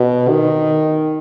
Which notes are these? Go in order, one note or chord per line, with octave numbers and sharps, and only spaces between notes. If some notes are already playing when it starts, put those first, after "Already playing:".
Already playing: B2
D#3